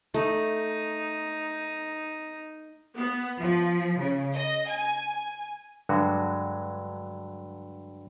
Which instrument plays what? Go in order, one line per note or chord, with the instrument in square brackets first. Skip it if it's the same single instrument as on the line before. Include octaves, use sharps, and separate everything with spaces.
[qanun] A3 [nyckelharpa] D#4
[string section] B3
F3
C#3
D#5
G#5
G#5
[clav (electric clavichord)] G2 D3 F#3 G#3 F#4